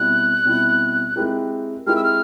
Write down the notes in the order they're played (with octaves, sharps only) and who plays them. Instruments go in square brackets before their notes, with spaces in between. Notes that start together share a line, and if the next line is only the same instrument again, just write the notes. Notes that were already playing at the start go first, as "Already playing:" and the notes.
Already playing: [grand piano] B2 G3 C4 E4 [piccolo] F#6
[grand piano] B2 G3 C4 E4
G#3 C4 E4 G4 A#4
[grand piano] G#3 C4 E4 G4 A#4 [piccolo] F6
[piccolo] E6
F6